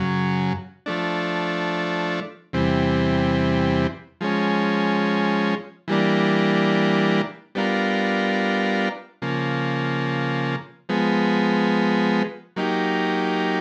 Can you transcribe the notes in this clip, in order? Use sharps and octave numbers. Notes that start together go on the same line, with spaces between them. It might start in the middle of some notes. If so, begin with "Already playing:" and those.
Already playing: F#2 C#3 F#3
F3 A3 D4
E2 C3 E3 G3 C4
F3 G#3 C#4
E3 G3 A#3 D4
G3 B3 D4 F4 A#4
C#3 F3 A#3
F3 G#3 B3
F#3 A#3 D#4 G4